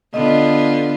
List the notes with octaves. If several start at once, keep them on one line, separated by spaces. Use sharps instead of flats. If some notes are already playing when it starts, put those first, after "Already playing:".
D3 B3 F4 D#5